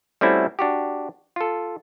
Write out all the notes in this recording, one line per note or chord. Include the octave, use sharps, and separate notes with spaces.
G3 A3 C4 C#4 E4 F#4
D4 F#4 G4
F4 A4